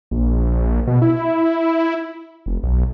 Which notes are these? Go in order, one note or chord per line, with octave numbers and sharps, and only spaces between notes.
A#1
B2
E4
F1
B1